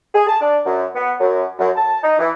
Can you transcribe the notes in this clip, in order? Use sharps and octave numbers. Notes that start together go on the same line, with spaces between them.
G#4
A5
D4
F#2
B3
F#2
F#2
A5
D#4
E3